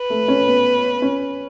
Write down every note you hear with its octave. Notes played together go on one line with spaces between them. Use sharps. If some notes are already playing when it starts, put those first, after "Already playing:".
Already playing: B4
A3
C#4
B3
C#4